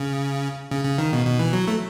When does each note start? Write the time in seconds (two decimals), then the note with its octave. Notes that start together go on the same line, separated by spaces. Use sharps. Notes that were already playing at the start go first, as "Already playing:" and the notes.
Already playing: C#3
0.71 C#3
0.85 C#3
0.98 D#3
1.13 B2
1.26 B2
1.39 E3
1.53 F#3
1.68 A3